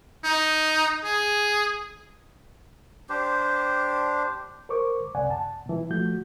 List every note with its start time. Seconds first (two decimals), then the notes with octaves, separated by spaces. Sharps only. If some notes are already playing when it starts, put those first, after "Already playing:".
0.24 D#4
1.04 G#4
3.09 D4 G4 C5
4.69 A#4 C5 C#6 D6
5.15 C2 F#2 C3 D5 F#5 G#5
5.30 A5
5.66 B2 E3
5.90 F3 A3 F#4 G6